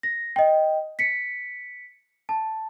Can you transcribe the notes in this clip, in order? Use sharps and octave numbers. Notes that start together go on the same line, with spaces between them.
A#6
D#5 G5
B6 C#7
A5